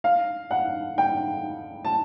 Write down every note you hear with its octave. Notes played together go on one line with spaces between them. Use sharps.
F5
F#5
G5
A5